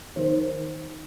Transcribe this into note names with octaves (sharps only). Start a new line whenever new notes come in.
D#3 C5